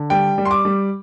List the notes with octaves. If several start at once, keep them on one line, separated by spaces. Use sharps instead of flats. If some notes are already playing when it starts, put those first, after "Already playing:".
Already playing: D3
G3 G5
G3
C6
D6
G3